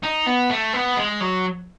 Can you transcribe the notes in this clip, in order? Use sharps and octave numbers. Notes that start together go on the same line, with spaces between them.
D#4
B3
A3
B3
G#3
F#3